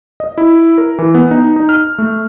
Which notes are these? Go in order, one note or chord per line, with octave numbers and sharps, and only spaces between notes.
D#5
E4
A#4
E3
B3
D#4
D#4
F6
A3